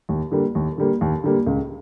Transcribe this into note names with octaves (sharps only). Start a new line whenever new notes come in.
D#2
D3 G3 A#3
D#2
D3 G3 A#3
D#2
D3 G3 A#3
C#2